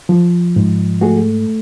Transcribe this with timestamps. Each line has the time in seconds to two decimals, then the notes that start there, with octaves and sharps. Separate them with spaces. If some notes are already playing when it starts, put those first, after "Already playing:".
0.09 F3
0.56 G#2
1.01 A3 F#4 G#4